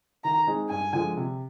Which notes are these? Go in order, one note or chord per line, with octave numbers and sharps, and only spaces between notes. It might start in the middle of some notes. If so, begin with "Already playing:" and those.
D#3 A#5
G#3 C4 D#4 G#4
G2 G#5
D3 F3 G#3
C3